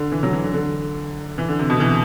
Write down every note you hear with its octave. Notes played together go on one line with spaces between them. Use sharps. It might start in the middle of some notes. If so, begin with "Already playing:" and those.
Already playing: D3
E3
F#3
E3
D3
D3
E3
D3
C3
B2
E3